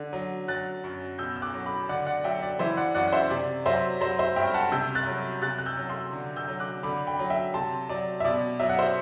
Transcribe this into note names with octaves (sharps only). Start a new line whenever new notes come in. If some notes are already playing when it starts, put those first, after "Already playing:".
Already playing: D3
F#3
F#3 F#6 A6
F#2
B2 E6 G6
E6
D6 F#6
F#3
B5 D6
D3 D5 F#5
D5 F#5
F#3 E5 G5
D5
E3 C5 E5
D5 F#5
F#2 D5 F#5
F#5
C5 E5
C3 D5
F#3 C5 E5
F#3 C5
C5 E5
G2 E5 G5
F#5 A5
C3 E6 G6
F#6 A6
F#3
C3 F#6 A6
F#6
E6 G6
F#3
C6 E6
D3
E6 G6
F#3
D6 F#6
D3 B5 D6
G5 B5
F#3
E5 G5
C3 A5 C6
F#3 D5
E5
B2 D5
F#3 E5
F#5
C5 E5